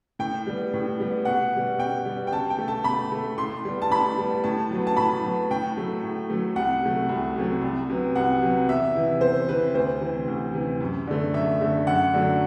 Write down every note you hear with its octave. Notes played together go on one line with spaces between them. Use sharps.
A2 G5
G3 B3
A2
G3 B3
B2 F#5
G3 B3
B2 G5
G3 B3
G5
B2 A5
G5
A3
A5
B2 B5
A3
A2 C6
G3 B3
A5
A2 B5
G3 B3
A2 A5
F#3 B3
A5
A2 B5
F#3 B3
A2 G5
F#3 A3
A2
F#3 A3
C2 F#5
C3 F#3 A3
C2
C3 F#3 A3
C2
C3 F#3 B3
C2 F#5
C3 F#3 B3
E2 E5
C3 E3
E2 C5
C3 E3 B4
D2 C5
C3 E3
D2
C3 E3
F#2
D3 A3
F#2 E5
D3 A3
F#2 F#5
D3 F#3 A3